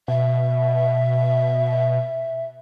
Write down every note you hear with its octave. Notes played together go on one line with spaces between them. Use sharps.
B2 E5